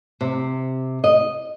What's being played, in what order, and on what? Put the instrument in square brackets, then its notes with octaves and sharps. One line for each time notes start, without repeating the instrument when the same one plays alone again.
[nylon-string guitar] C3
D#5